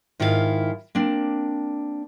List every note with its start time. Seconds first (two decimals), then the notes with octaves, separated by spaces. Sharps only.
0.20 G#2 D#3 E4 F4 C5 F5
0.95 A#3 C4 D4